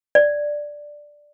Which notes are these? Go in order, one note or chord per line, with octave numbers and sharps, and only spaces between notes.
D5